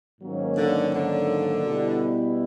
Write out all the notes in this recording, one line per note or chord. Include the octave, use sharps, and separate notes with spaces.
G#2 D#3 F#3 A#3 C#4
D3
D3
B2 G3 B3 E4